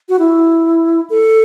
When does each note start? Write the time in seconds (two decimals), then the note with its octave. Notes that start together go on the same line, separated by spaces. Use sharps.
0.09 F#4
0.19 E4
1.10 A4